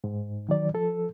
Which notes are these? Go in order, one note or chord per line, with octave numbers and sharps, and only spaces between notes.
G#2
D#3 F#3 D5
F3 A4